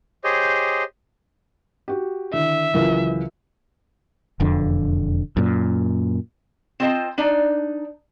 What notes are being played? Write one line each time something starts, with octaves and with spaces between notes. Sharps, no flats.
G4 G#4 C5 C#5 D#5
F#4 G4
D3 D#3 E4 E5
C#2 E3 F#3 F4 A#4
E1 F2 D3
F#2 A#2
C4 F4 C5 D#5 F#5 A5
D4 D#4 D5